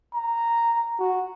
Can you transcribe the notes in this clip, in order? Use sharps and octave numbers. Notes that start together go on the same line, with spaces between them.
A#5
F#4